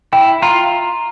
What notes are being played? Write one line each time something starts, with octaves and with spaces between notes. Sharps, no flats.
E4 G5
F4 A#5